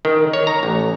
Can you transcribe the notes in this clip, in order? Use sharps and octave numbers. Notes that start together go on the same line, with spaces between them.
D#3
C#5
A#5
A1